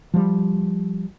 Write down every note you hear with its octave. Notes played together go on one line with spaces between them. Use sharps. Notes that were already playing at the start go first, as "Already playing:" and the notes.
F3 G3